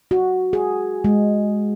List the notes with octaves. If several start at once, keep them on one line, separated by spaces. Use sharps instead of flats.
F#4
G#4
G#3